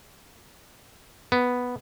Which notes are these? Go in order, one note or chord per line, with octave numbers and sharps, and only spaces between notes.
B3